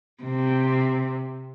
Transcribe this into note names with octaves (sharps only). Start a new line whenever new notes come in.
C3